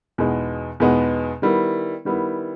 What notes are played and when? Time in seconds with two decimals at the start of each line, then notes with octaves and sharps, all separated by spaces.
0.18 E2 B2 G#3 B3 D#4
0.80 E2 B2 G#3 B3 D#4
1.42 D#3 G3 B3 E4
2.05 D#3 G3 B3 E4